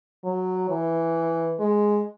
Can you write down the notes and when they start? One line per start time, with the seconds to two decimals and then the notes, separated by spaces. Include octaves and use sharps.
0.24 F#3
0.70 E3
1.60 G#3